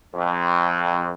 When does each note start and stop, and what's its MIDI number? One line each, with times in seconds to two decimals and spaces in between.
0.14 1.12 41